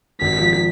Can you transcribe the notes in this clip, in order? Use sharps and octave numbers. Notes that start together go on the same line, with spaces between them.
G#1 B6
F3